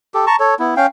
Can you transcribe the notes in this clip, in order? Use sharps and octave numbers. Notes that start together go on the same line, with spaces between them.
G4 A4
A5 A#5 C#6
A4 C#5
B3 E4
C#4 F5 G5